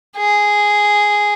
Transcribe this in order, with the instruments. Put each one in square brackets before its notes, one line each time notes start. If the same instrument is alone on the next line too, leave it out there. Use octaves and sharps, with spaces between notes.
[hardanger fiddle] G#4